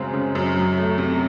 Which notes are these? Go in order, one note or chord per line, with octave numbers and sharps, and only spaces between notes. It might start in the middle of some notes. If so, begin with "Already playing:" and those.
Already playing: F#2 C#3 G#3 C4
C#3
F#2
F#3
A3
C3